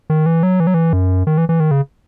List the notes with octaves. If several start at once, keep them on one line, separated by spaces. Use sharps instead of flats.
D#3
E3
F#3
E3
F#3
E3
F#2
D#3
E3
E3
D#3
C#3